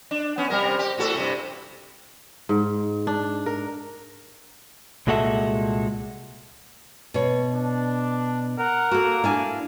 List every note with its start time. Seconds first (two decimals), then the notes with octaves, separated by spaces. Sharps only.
0.11 D4
0.38 B3 C#4
0.50 C3 G3 A#4
0.79 G4
0.98 A2 F#4 A4
1.16 G2 C3
2.49 G#2
3.07 D4
3.46 A#4
5.07 C2 A#2 G#3 F#4 A4 E5
7.14 B2 C#5
7.52 D4
8.59 A#4 F#5
8.91 A#3 F#4 A4
9.24 D4 E4 G#5